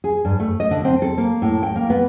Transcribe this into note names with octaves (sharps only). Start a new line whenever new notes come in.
G#4
G2
A3
D#5
D3
C4
A4
A#3
A2
G5
A#3
B3